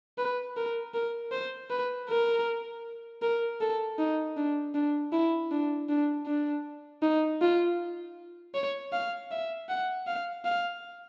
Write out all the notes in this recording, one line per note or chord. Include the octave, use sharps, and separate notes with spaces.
B4
A#4
A#4
C5
B4
A#4
A#4
A4
D#4
D4
D4
E4
D4
D4
D4
D#4
F4
C#5
F5
E5
F#5
F5
F5